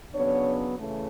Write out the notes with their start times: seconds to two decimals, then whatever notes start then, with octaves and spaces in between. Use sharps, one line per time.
0.14 C#3 F#3 B3 D4 C#5
0.77 C#3 E3 A3